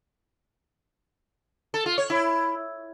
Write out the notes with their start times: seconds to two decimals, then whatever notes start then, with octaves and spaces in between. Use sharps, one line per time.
1.74 A4
1.86 F4
1.98 C#5
2.10 E4